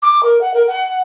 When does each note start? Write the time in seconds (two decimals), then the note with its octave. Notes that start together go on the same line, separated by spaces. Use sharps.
0.02 D6
0.23 A#4
0.41 F#5
0.54 A#4
0.68 F#5